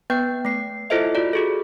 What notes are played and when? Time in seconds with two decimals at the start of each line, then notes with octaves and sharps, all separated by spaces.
0.10 B3 B4 G5 G6
0.45 A3 C7
0.90 E4 F4 A4 C5 D#5 E5
1.15 F4 F#4 D5
1.33 F#4 G#4 A4